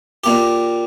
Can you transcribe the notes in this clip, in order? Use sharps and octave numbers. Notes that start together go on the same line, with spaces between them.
A#2 A#3 G4